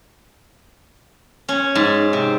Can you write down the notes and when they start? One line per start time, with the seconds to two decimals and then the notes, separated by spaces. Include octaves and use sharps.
1.49 C#4
1.75 G#2
2.13 C3